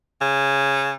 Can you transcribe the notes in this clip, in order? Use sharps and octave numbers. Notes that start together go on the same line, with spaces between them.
C#3